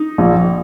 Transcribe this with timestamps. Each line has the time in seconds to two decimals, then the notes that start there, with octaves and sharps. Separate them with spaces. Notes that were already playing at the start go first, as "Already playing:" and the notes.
Already playing: D#4
0.18 A#1